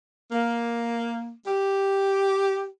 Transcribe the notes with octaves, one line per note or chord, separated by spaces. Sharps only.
A#3
G4